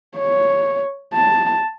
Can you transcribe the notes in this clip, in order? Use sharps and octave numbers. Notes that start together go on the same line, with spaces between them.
C#5
A5